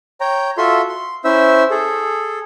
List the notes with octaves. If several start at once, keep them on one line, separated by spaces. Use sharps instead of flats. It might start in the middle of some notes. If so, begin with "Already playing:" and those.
C#5 G5 A#5
F4 F#4 A4 E5 C6
C6
C#4 E4 C5 E5 E6
G#4 A4